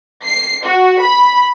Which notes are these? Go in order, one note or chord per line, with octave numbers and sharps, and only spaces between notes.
C7
F#4
B5